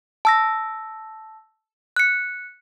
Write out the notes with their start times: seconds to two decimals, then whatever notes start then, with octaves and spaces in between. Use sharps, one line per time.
0.25 A5 E6 A#6
1.96 F#6 C#7